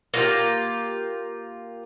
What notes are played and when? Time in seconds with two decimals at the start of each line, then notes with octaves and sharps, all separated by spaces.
0.14 A#3 F4 G4